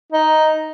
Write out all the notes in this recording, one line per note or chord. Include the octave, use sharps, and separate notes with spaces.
D#4